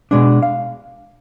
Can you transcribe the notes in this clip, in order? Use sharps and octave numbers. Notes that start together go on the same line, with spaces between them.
B2 G#3 D4
F5